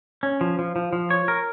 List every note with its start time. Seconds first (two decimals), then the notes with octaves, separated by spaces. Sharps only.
0.23 C#4
0.41 F3
0.59 F3
0.76 F3
0.93 F3
1.10 C#5
1.28 A#4